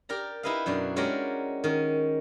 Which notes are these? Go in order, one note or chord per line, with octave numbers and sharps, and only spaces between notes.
G4 A#4 D5 A#5
D#4 E4 G4 B4 D#5 F5
F#2 B2 D4
G#3 C#4 F#4 G4 A#4 D5
D#3 C#4